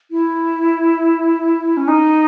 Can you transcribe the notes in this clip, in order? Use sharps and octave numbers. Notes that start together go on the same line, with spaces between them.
E4
C#4
D#4